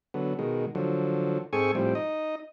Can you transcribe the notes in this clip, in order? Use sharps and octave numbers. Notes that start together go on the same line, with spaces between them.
D3 F#3 B3
B2 D#3 G#3
D3 F3 F#3
G#2 C4 G#4 A4 G#5 C#6
A2 F3 G3 C4
D#4 D#5